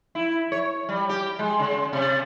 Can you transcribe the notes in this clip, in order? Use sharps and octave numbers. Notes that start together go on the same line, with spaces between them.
E4
C#5
G3
G4
G#3
C#3
C3